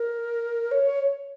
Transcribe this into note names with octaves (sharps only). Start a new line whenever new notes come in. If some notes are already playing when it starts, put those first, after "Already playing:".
Already playing: A#4
C#5